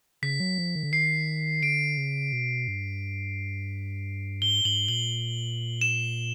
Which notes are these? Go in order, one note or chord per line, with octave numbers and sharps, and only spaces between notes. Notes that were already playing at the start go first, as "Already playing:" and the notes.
C#3 B6
F#3
F3
D#3
D3
D#3 C7
D3 D7
C#3
B2
G2
G#2 G7
G#2 F#7
A#2 F#7
E7